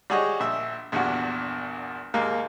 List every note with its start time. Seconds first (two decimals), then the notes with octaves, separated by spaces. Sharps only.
0.10 G3 F#4 G#4 C#5 D#5
0.40 A#1 E5
0.92 A#1 E2 G2 F#4
2.14 D#2 G#2 A#3 F5